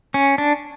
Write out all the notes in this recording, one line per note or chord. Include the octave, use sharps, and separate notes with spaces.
C#4
D4